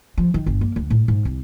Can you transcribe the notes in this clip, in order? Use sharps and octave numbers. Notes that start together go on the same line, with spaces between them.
F3
D#3
G1
A#3
D2
A2
G#2
C2